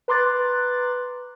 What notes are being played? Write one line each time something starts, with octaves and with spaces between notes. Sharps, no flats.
B4 A#5 C6 D6 F#6 A6